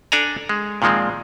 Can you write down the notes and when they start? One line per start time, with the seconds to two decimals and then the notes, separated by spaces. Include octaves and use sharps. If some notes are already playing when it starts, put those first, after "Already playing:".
0.12 D4 A4 D5 G#5 A#5
0.49 G#3
0.82 A#2 D#3 F3 G#3 C4